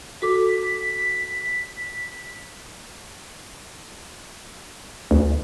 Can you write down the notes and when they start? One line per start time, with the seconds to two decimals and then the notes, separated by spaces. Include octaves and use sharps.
0.22 F#4 A4 D6 B6
5.11 D2